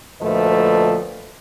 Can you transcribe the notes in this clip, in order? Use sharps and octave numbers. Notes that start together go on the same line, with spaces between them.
D2 A#2 F3 A3 B4 D#5